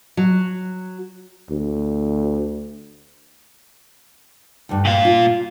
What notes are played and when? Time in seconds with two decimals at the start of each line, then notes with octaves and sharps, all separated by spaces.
0.17 F#3
1.50 D2
4.69 D2 G2
4.85 A#2 F5
5.05 F4